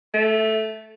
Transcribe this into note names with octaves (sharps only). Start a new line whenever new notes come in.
A3